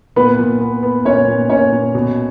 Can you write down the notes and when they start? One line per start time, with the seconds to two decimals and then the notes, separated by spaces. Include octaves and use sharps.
0.16 A#2 B3 B4
0.39 A#2
0.61 B3
0.83 B3
1.05 A#2 C#4 C#5
1.28 A#2
1.50 A#2 C#4 C#5
1.72 A#2
1.94 B2